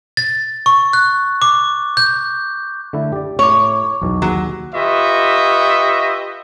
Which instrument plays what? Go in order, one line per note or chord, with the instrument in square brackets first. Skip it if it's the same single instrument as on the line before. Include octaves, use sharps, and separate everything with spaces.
[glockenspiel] A6
C#6
F#6
D6
G6
[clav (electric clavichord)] D3 A3 E4
G4 D5
[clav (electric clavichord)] A2 [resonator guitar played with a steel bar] C#5 [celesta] C#6 D6
[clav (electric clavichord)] B1 E2 B2
[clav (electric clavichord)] D#2 G#4 [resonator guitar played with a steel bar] F#3
[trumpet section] F4 G4 B4 D#5 E5 C#6